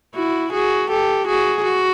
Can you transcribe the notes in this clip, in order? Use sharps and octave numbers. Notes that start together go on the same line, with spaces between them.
E4 F#4
F#4 G#4
G4 A4
F#4 G#4
F#4